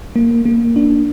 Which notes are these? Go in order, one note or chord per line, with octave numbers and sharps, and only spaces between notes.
A#3
A#3
D4